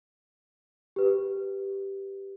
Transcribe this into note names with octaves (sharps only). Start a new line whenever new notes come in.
G4 B4